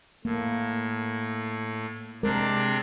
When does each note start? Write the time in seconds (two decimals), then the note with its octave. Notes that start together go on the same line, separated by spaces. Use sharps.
0.25 A2 A#3
2.23 C3 G#3 D4 A#4